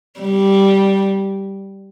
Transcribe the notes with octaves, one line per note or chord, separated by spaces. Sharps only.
G3